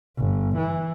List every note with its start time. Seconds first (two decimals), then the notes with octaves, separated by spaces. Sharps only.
0.17 G1
0.57 E3